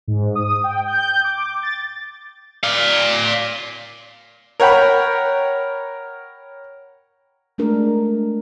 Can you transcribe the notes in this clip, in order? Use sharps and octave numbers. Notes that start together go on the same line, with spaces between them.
G#2
D#6
G5
G6
D6
A6
D5 F5
A#4 C#5 F#5 G5 B5
G#3 A3 D4 A#4